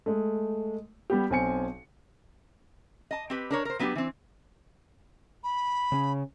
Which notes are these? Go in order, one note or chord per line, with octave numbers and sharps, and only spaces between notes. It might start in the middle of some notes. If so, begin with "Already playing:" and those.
G#3 A3
G3 B3 G4
B1 C4 G#5 C#7
D#5 A5
C4 G4 B4
D4 A#4 C#5
A#4 C5
F#3 B3 D4 F4 G4
E3 C4
B5
C#3 C#4